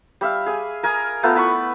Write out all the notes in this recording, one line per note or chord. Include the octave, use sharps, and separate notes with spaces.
G3 E5 F5
G#4 G#5
A#4 G#5 D#6
A3 B3 F4 A#4
E4 B4 B5 C#6